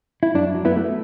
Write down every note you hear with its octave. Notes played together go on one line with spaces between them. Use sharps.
E4
F#2 D4
F#3
B3 E4
A3